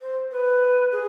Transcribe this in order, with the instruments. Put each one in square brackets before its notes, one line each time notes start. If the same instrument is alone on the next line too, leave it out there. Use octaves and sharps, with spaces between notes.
[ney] C5
B4
G#4